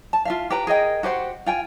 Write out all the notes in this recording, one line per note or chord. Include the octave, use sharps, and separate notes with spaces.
A5
F4 E5 F5
G4 B4 A#5
G#4 A#4 D#5 G5
F#4 G4 C5 F#5
F4 G5 G#5